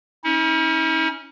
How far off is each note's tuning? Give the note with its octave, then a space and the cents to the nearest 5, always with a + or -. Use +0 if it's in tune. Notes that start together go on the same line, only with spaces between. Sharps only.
C#4 +0 E4 -45